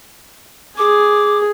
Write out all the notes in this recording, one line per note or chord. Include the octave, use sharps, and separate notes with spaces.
G#4 D6